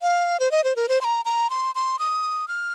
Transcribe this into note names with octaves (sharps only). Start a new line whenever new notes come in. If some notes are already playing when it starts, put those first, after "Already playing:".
F5
C5
D#5
C5
A#4
C5
C6
A#5
A#5
C6
C6
D#6
F6